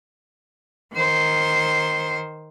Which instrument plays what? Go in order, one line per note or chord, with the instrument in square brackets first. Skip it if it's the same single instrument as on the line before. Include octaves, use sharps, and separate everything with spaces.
[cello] D#3 C5